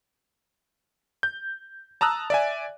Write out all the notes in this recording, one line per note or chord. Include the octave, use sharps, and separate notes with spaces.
G6
A5 A#5 D#6 E6 F#6
D5 E5 G#5